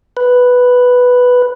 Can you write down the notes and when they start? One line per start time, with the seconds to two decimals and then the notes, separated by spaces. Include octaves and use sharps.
0.17 B4